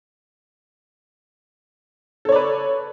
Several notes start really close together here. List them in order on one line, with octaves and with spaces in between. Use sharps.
A4 C#5 D5 B4